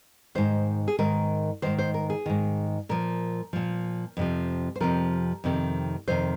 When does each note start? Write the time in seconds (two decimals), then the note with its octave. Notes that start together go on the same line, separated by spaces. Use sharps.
0.35 G#2 D#3 C5
0.88 G#4
0.99 G#2 D#3 A#4
1.62 G#2 D#3 C5
1.79 C5
1.94 A#4
2.10 G#4
2.26 G#2 D#3
2.89 A#2 F3 A#4
3.53 A#2 F3
4.17 F2 C3 F3
4.76 C5
4.80 F2 C3 F3 A#4
5.44 F2 C3 D#3
6.08 F2 C3 D#3 C5